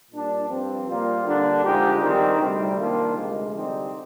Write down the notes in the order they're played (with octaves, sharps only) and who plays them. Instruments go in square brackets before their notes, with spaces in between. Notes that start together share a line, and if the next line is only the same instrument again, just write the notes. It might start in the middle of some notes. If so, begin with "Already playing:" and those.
[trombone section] A#2 G3 D4
G2 F3 C4
A#2 G3 A#3 F4
D3 G3 A#3 D4
D3 F3 G#3 D#4 G4
D#3 G3 C4 D#4
D2 C3 G3
D#3 A#3 D4 F4
D2 C3 F3 G#3
D3 G3 C4 D#4 G4